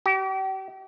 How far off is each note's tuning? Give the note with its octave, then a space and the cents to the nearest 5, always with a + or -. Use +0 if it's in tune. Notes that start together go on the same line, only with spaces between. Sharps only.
G4 -40